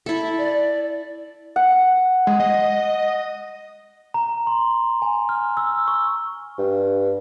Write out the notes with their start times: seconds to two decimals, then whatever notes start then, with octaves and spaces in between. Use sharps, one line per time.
0.06 E4 A4 E5
0.37 D5
1.56 F#5
2.27 G#3
2.40 D#5
4.14 A#5
4.47 C6
5.02 G#5
5.29 F6
5.57 E6
5.88 C#6
6.58 G2